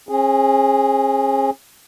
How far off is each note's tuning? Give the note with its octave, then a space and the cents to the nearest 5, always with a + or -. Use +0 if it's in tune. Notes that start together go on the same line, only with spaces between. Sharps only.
C#4 -45 G#4 +0